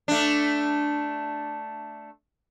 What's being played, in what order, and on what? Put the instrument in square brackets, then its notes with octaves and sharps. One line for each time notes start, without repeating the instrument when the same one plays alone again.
[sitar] A3 D4